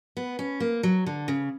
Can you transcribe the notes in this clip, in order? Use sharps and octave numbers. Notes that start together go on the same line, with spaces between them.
B3
C#4
A#3
F#3
D3
C#3